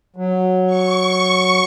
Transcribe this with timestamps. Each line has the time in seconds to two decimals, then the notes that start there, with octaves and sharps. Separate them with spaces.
0.16 F#3
0.66 C#6